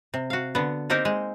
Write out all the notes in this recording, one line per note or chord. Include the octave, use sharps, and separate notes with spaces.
C3
F#4 F5
D3 B3
A#3 C4 D#4 G4 A#4 C5
G#3